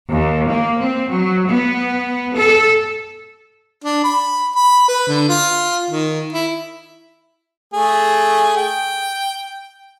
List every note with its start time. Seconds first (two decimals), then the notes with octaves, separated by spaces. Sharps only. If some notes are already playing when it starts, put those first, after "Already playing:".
0.10 D#2
0.50 A#3
0.81 C4
1.11 F#3
1.47 B3
2.37 A4
3.84 D4
4.04 B5
4.55 B5
4.88 B4
5.08 D3
5.29 F4
5.90 D#3
6.33 E4
7.73 A3 G#4
8.57 G5